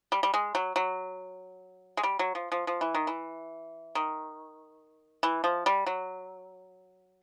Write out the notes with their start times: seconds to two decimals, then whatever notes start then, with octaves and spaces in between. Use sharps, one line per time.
0.12 G3
0.23 G3
0.34 G#3
0.55 F#3
0.76 F#3
1.97 G#3
2.03 G3
2.19 F#3
2.35 F3
2.52 F3
2.67 F3
2.81 E3
2.95 D#3
3.07 E3
3.95 D#3
5.23 E3
5.44 F3
5.66 G3
5.86 F#3